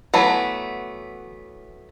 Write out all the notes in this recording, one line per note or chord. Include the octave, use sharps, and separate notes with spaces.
E3 F#3 A3 B3